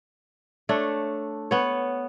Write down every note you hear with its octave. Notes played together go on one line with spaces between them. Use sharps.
A3 D4 C#5
B3 C#5